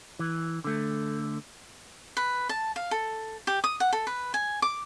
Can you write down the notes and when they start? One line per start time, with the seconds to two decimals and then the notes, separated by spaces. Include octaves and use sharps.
0.19 E3
0.64 D3 A3
2.17 B4
2.49 A5
2.76 F5
2.91 A4
3.47 G4
3.64 D#6
3.80 F#5
3.93 A4
4.07 B4
4.34 G#5
4.62 D6